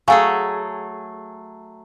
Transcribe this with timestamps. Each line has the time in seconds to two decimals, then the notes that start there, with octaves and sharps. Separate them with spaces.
0.08 F#3 A3 G#4 F5 G#5 C#6